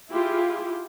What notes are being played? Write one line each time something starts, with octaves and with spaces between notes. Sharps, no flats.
E4 F4 G4 G#4